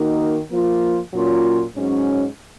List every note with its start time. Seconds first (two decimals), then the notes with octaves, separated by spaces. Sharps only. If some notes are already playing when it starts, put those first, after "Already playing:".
Already playing: D#3 A#3 D#4 F#4
0.50 F3 A#3 F4
1.13 A#2 F#3 C#4 F4
1.76 G#2 F#3 C#4